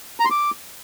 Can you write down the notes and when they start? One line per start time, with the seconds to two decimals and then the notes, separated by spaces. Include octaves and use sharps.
0.20 A#5
0.25 C6
0.31 D6